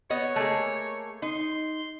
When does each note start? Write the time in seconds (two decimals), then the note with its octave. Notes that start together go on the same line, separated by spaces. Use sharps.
0.10 B3 C#5 D#5
0.36 A3 A#3 G#4
1.22 D#4 C6